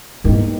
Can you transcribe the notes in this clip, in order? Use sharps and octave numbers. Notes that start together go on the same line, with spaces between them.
E2 G2 D#3 G3 A#3